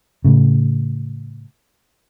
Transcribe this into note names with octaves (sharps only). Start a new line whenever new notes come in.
A2 C#3